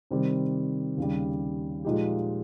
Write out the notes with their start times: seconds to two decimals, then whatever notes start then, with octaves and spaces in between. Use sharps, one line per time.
0.11 C3 D#3 G3 C4 G4
0.97 D#2 C#3 G3
1.85 A#2 F3 G#3 D#4 G4